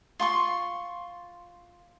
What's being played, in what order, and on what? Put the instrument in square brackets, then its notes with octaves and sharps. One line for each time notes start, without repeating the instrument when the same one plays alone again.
[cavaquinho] F4 C6 C#6